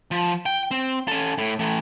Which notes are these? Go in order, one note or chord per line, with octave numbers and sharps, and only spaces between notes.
F3
G5
C4
C#4 A4
A2
E3 A3